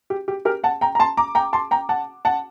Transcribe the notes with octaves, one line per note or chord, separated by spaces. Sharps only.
G4
G4
G4 A#4
F#5 A5
G5 A#5
A#5
A5 C6
A#5 D6
G5 A#5
A5 C6
G5 A#5
F#5 A5
F#5 A5